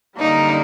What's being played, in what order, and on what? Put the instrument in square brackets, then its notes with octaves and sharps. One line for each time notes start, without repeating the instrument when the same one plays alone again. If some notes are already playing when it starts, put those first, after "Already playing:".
[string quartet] F#2 D3 G3 A#3 D#4